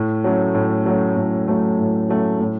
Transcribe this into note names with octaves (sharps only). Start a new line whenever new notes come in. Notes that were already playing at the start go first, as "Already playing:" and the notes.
Already playing: A2
F#3 A3 C#4
A2
F#3 A3 C#4
A2
F#3 A3 C#4
A2
F#3 A3 C#4
A2